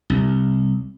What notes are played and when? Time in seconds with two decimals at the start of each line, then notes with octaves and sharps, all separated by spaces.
0.10 C2